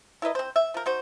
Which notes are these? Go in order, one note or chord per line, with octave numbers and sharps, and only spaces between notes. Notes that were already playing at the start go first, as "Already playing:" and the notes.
E4 A#4 B4 D#5
C4 C5
E5
F3 A#4
D#4 F#4 C5